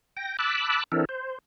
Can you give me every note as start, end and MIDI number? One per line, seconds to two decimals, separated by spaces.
0.17 0.37 79
0.17 0.37 94
0.39 0.84 81
0.39 0.84 83
0.39 0.84 86
0.39 0.84 88
0.39 0.84 90
0.92 1.05 52
0.92 1.05 60
0.92 1.05 62
0.92 1.05 64
0.92 1.05 69
0.92 1.05 70
1.09 1.38 72